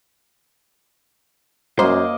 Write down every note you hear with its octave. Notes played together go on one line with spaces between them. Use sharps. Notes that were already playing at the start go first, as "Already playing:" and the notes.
F#2 A#3 C5 D#5 C6